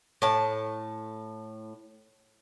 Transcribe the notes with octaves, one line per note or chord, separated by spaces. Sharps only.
A2 A5